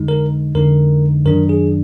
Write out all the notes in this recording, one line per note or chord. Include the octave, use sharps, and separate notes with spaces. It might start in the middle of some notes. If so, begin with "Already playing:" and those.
Already playing: F2 D3 G#3 D#4
A#4
F2 D3 G#3 D#4 A#4
F#2 D#3 F#3 D4 A#4
G#4